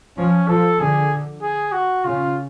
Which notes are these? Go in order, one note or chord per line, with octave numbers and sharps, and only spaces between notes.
F3 C#4
F3 A4
D3 G#4
G#4
F#4
C#3 F4